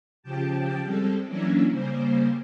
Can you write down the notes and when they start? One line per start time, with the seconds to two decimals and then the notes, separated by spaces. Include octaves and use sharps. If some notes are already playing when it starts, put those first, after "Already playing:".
0.23 C#3 F3 G4 G5 A5
0.81 G3 G#3 C4 A4
1.26 E3 F#3 A#3 C#4 D4 E4
1.71 C#3 G3 A#3 C5